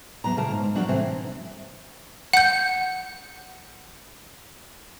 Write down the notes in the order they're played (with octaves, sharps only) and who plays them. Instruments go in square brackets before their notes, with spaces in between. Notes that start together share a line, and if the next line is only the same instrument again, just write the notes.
[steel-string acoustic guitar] E2 G#2 F#3 B3 A#5
D2 A#2 C#3 A#4 F5 A5
G#2
F3 F#3 D4 F#4 A#4
E2 A2 C3 E3 C4
[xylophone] F#5 G6